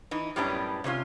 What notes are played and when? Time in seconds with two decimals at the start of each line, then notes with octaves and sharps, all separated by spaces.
0.11 E3 D#4
0.36 F#2 A2 G3 B3 C#4 D4
0.84 C3 G#3 C#4 F4